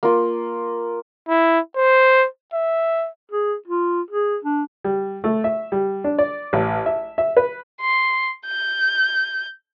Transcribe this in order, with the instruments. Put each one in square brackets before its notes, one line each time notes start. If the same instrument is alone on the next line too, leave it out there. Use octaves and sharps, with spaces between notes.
[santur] A#3 F4
[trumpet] E4
C5
E5
[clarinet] G#4
F4
G#4
D4
[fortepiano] G3
A3
E5
G3
D4
D5
A1
E5
E5
B4
[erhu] C6
G6